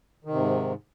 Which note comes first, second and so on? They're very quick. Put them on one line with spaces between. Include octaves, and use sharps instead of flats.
D#3 C3 G#2